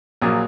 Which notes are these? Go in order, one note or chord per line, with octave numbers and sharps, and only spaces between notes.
A#1 A#2 F#3 A#3 D#6